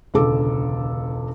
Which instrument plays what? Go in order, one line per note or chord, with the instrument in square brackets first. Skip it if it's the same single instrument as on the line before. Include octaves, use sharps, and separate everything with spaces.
[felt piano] E1 C#2 D3 A4 D6